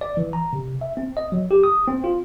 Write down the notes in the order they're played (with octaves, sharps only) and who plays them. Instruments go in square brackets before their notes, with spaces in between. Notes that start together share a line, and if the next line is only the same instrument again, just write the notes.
[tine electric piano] D5
E3
A#5
C3
E5
C4
D#5
F#3
G4
D#6
C4
F4